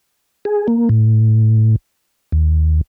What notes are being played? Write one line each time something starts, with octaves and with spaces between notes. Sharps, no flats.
G#4
A#3
A2
D#2